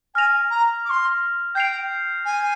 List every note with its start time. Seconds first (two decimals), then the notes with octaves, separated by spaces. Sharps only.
0.15 G#5 F6 A#6 F7
0.50 A#5
0.85 D6
0.90 C6
1.55 G5 G6 C7 F7
2.25 G#5